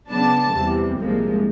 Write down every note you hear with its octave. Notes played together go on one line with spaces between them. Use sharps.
C#3 F#3 B3 D4 A5
E2 C3 E3 G3
C2 A#2 F3 G#3